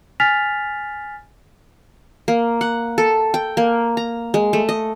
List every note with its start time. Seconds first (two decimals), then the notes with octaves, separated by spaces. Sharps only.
0.20 G#5 F6 A6 B6 F7
2.28 A#3
2.61 F#5
2.98 A4
3.34 G5
3.57 A#3
3.97 A#5
4.34 G#3
4.53 A3
4.69 D#5